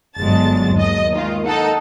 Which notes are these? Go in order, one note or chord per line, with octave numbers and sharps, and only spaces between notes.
G1 F#3 G#3 A5 A6
D#2 D#5
D#3 G#3 F4
D#4 A4 F#5 A5